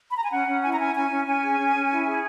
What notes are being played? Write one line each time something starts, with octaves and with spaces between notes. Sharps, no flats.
B5
A#5
G#5
C#4 F#5
C#4
E4 G#5
A#5
C#4 G#5
C#4 G#5
C#4
C#4 G#5
G#4
C#4
C#4
E4
G#4